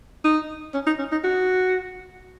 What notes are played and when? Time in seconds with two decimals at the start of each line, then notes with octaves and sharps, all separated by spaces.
0.25 D#4
0.74 C#4
0.87 D#4
0.99 C#4
1.12 D#4
1.24 F#4